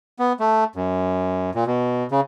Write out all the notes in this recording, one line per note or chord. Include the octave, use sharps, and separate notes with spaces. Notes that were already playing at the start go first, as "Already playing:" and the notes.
B3
A3
F#2
A#2
B2
C#3